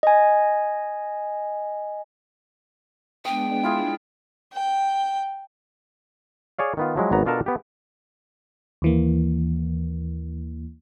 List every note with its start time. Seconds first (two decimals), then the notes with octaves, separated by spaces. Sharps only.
0.03 D#5 G#5
3.25 G#3 B3 D4 G5 D#6
3.63 E4 F4 G#4
4.53 G5
6.58 G#4 C#5 D5 F5
6.77 D#3 B3 F4
6.96 F3 F#3 G#3 E4
7.11 G#1 F#3 B3 A#5
7.26 B2 D4 F4 A4 A#4 A5
7.46 B3 G4
8.82 D#2 E3 A#3